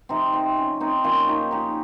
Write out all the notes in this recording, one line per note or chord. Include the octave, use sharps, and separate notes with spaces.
C3 F3 C4 D#4
C4
C#4
C4 D#4
A#2 F3 C#4 F4
D#4 G4
D#4 G4